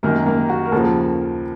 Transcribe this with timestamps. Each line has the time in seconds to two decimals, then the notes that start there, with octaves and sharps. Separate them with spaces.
0.03 F#2 D#3 F#3 A#3 A#4
0.26 A#3 A#4
0.50 F#4
0.65 A#4
0.72 D#2 C#3 F3 A4